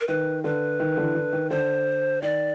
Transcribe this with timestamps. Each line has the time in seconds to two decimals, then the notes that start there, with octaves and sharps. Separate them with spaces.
0.01 A#4
0.08 D#3 B4
0.44 D3 B4
0.80 D#3
0.97 D3 E3
1.15 D3
1.33 D#3
1.50 D3 C5
2.22 D#3 D5